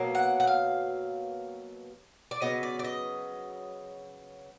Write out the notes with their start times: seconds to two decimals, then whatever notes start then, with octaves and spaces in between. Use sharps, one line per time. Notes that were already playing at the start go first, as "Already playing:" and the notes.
Already playing: B2 F#3 A#3
0.15 F#5
0.40 F#5
0.47 F5
2.31 D5
2.42 C#3 F#3 B3 D#5
2.63 D5
2.79 D5
2.84 D#5